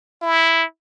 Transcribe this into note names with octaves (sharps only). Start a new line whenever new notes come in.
E4